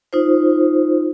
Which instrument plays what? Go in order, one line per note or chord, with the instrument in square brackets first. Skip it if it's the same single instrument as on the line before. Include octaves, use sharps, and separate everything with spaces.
[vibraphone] D#4 F4 C5